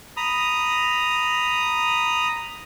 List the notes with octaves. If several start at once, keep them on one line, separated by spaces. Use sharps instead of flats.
A#5 B5 D#6